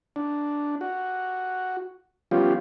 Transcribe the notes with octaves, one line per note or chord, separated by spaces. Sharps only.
D4
F#4
F3 G3 B3 C#4 F4 G4